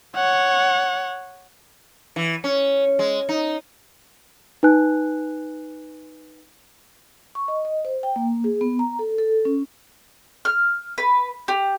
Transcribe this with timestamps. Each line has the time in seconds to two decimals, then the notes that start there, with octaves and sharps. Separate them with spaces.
0.16 C#5 F#5
2.16 E3
2.44 C#4
2.99 G#3
3.29 D#4
4.63 D#4 B4 G#5 F#6
7.35 C#6
7.48 D#5
7.65 D#5
7.85 C5
8.03 G5
8.16 A#3
8.44 G#4
8.61 B3
8.79 A#5
8.99 A4
9.18 A4
9.45 C#4
10.45 F6
10.98 B4
11.48 G4